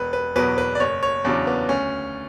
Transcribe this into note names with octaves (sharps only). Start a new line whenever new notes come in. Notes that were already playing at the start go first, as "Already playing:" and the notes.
Already playing: E1 B4
B4
E2 B2 F#3 B4
B4
D5
F#1 C#5
C#5
E2 C#3 F#3 D4
B3
D2 C#4